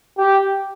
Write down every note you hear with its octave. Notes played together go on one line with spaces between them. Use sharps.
G4